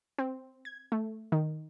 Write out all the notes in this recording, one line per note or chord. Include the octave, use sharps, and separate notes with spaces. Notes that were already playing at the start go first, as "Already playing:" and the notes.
C4
G#6
A3
D#3